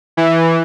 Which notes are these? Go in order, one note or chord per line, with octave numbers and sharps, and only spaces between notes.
E3